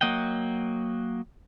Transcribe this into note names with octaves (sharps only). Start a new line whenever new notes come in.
F#3 A#3 D#5 F#5 G5